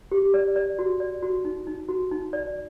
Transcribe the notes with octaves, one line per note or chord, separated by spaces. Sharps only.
G4
D5
D5
F#4
D5
F#4
D#4
D#4
F#4
D#4
D5